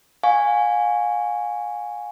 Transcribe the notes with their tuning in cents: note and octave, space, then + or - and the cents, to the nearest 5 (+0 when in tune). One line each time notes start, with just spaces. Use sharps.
F5 +35 G#5 -10 C#6 +0